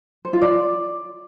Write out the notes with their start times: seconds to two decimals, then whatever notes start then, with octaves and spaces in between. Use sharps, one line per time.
0.25 C5
0.33 F4
0.42 D5